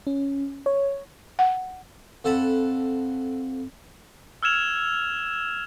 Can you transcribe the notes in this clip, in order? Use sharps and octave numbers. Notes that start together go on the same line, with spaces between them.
C#4
C#5
F#5
F2 A4 F#5 A5 B5
E6 F6 G#6 E7 F7